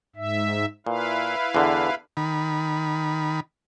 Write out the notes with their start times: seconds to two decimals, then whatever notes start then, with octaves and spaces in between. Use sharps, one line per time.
0.16 G#2 E5
0.87 A#2 E4 B4 F5
1.55 E2 D3
2.17 D#3 B5